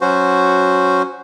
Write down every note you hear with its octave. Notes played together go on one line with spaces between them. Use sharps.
F#3 C#4 F#4 C5